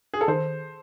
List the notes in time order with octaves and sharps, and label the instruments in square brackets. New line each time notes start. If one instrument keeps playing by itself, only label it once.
[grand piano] G#4
A4
[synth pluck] D#3 [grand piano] C5